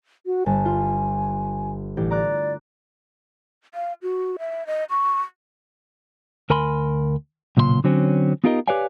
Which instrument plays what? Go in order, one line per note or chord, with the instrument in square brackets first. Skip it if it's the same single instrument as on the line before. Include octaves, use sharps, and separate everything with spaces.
[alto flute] F#4
[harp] G1 A5 [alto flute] G#5
[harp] F4
A1 G4
[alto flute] D5 [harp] A#5 D6 F#6
[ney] F5
F#4
E5
D#5
C#6
[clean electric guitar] D2 A#4 G#5 B5 C6
B1 A#2 C#3 F4 C6
D3 F#3 C4 C#4
B3 D#4 F4 G4 A#4 D#5
G4 B4 C#5 D5 F5 G#5